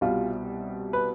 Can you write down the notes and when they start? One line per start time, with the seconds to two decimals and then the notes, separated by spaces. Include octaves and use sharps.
0.01 C2 B2 G3 F4
0.93 B4